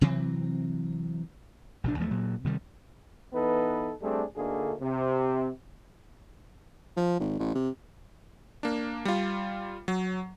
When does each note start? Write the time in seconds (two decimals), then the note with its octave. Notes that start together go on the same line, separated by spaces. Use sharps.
0.01 C3 E3 F#3 C4
1.84 A#1 C3 F3 D4
1.98 E2 F3 A3
2.11 A#2 F#3
2.44 C3 D#3 G3
3.33 E3 B3 D#4 A4 B4
4.02 G3 A3 C4 D4 G#4 A4
4.36 D2 D3 A3 A#3 D#4 G#4
4.81 C3
6.97 F3
7.20 G#1
7.39 A1
7.55 C3
8.63 A#3 D4
9.05 G3 F4
9.88 F#3